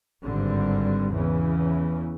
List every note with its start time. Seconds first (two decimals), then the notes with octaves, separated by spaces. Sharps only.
0.24 G#1 G2 D3 G3 C4
1.12 E2 C#3 E3